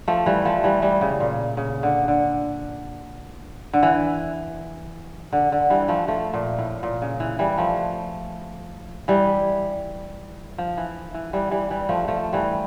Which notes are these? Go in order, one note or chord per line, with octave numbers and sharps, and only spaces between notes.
F3 A3
E3 G3
F3 A3
E3 G3
E3 G3
C#3
A#2
C#3
D3
D3
D3
E3
D3
D3
E3 G3
F3 A3
F3 A3
A#2
A2
A#2
C#3
E3
E3 G3
F3 A3
E3 G3
F3
E3
E3
E3 G3
E3 G3
E3 G3
F3 A3
F3 A3
E3 G3